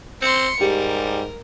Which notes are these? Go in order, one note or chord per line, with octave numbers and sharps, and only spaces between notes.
C4 C6 C#7
G#2 G3 G4 A#4